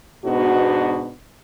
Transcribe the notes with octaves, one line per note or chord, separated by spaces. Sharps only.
G#2 B2 B3 D4 F#4